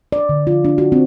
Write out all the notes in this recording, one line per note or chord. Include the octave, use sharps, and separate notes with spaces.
D5
D3
F4
D4
F#4
C4